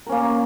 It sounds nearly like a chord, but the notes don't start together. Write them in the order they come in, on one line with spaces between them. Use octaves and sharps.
A#4 C#4 A#3